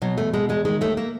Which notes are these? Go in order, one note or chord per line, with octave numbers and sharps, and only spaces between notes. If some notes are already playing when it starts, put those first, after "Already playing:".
B2 F#3
E2 A3
B2 G#3
E2 G#3
D#3 G#3
D#2 A3
A#3